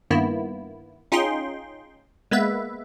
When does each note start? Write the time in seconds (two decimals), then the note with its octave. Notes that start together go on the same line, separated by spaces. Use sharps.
0.10 G2 D#3 A#3 B3 E4
1.12 C#4 D#4 F4 G#4 G5 C6
2.31 G#3 A#3 B3 B4 E5